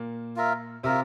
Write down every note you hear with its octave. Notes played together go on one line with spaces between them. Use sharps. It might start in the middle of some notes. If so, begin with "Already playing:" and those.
Already playing: A#2 A#3
F4 A#4 E5
C3 C4 F4 A#4 E5